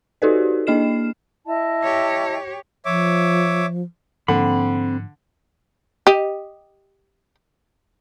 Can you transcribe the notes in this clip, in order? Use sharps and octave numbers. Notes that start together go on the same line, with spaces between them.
D#4 F#4 G4 A4 B4 D5
A#3 D4 D#5 F6 C7 E7
E4 D#5 A5
G4 C#5
F3 C#5 E5 D6
G#2 D3 F3 A#3 C4 B5
G4 D#5